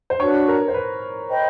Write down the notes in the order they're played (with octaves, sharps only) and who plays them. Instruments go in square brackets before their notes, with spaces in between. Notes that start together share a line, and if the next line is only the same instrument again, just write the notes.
[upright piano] C5
[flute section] D4 F#4 B4 [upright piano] C#5
[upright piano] A#4
C5
B4
[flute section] C5 D#5 G5 B5